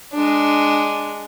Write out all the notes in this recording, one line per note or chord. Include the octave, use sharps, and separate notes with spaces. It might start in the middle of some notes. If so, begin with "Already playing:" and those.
G#3 D4